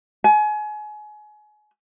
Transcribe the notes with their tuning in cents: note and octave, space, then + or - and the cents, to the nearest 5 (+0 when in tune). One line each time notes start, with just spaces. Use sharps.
G#5 +30